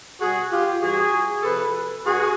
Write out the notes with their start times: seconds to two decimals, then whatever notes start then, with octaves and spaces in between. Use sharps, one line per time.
0.20 B2 G3 F#4 G#4
0.51 F4 G4
0.81 G2 E3 G3 F#4 G#4
1.43 C3 F3 A4 B4
2.05 G2 F#4 G#4